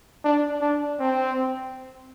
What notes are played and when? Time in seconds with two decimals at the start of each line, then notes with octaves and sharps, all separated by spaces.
0.24 D4
0.61 D4
0.99 C4